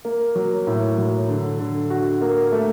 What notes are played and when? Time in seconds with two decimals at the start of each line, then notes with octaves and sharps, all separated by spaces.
0.05 A#3
0.35 F#3
0.67 A2
0.98 F#3
1.29 D3
1.60 D3
1.90 F#4
2.21 A#3
2.52 A3